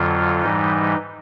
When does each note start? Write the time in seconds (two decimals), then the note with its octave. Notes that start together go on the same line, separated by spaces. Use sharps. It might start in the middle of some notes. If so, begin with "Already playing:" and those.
Already playing: F2 D3 F#3 F4
0.42 G#2 E3 G3 D#4